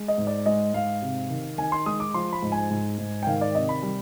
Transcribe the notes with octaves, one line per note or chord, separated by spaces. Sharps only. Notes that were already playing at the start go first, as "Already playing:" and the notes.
Already playing: G#3
D#5
G#2
D5
G#3 D#5
G#2 F5
C3
D#3
D#3 G#5
C6
G#3 D#6
D6
F3 C6
B5
G#2
G#5
G#2
G#2
G5
D#3 F5
D5
C3 D#5
B5
G3